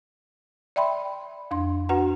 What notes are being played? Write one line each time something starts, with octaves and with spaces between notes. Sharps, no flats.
D5 E5 G5 B5 C6
F2 D4 C6
D4 F#4 B4 F#5 A#5